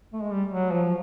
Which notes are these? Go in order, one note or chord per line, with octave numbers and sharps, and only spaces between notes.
A3
G#3
G3
F#3
F3